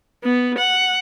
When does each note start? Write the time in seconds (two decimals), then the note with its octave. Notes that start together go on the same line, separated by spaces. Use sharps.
0.23 B3
0.58 F#5